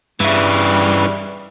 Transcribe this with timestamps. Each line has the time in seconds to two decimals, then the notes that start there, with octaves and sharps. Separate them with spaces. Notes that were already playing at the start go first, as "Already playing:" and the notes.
0.20 G2 C#3 E3 G3 E5